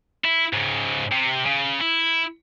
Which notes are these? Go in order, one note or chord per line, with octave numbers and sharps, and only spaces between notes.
E4
G#2 C#3
C3
C#3
E4